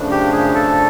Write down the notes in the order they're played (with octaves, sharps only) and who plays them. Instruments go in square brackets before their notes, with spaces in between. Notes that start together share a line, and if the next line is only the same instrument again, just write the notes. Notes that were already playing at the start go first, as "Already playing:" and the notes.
Already playing: [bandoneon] F#2 C#3 F3 A3 D4
[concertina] G4
G#4
A4